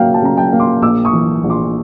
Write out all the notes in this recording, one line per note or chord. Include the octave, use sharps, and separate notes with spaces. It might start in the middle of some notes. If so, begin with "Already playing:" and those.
Already playing: C#3 F#3 A#3 E5 F5 G5
G5 A5
C#3 A#5
G5 A5
A#3
C6 D6
A#1 D6 E6
C#6 D#6
E3
A#1
C6 D6